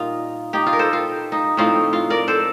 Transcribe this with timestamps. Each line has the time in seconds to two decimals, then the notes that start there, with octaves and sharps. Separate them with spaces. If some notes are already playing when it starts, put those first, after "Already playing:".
Already playing: A#2 G3 D#4 F4
0.53 D#4 G4
0.67 F4
0.73 A#4
0.79 A4 C5
0.93 F4
1.32 D#4
1.57 A2 F3 C4 D#4 F4
1.93 F4
2.10 A#4 D5
2.28 A4 C5